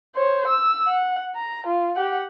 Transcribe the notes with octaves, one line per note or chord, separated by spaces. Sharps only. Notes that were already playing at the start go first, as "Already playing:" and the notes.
C5 C#5
E6
F#5
A#5
F4
G4 F#5